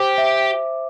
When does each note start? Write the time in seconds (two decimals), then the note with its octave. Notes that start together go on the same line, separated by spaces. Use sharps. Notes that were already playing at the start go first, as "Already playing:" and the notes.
Already playing: G4 C5 D6
0.18 E5